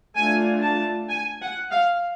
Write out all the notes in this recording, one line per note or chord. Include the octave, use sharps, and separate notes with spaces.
A3 D4 F4 G#5
A5
G#5
F#5
F5